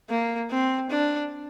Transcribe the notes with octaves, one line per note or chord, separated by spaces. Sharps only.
A#3
C4
D4